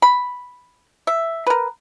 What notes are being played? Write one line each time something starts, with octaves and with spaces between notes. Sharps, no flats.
B5
E5
A#4 B4